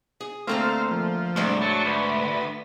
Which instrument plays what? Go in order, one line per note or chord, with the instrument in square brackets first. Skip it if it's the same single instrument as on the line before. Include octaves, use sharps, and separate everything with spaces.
[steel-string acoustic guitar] G#4
[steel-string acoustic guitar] D2 A4 A#5 [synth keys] A3 A#3 C4 [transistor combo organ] C5 F5
[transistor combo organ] F3
[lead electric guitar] C2 [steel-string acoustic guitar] G#2 D4 [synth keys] A3
[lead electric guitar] F#3 [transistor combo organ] A5 C#6
[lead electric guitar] D2 [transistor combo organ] B4